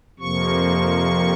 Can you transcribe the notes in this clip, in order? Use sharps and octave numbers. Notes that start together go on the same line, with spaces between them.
F2 C3 F3 A#3 C#6